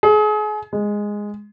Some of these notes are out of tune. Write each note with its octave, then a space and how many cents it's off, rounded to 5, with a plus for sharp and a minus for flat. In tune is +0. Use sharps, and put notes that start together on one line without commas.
G#4 +35
G#3 -5